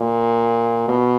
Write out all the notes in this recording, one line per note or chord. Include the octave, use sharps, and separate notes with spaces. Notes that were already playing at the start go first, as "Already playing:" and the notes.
Already playing: A#2
B2